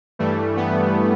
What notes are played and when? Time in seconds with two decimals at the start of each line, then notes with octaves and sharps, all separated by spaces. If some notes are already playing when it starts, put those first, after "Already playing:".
0.19 G2 E3 G3 A3
0.57 B3